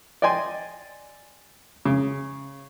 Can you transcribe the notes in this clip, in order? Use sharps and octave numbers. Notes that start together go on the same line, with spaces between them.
D5 D#5 G5 G#5 C6
C#3